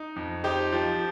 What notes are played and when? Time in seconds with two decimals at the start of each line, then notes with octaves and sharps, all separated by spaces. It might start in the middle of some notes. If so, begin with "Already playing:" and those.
Already playing: D#4
0.16 F2
0.44 D#4 G4 C5
0.72 F3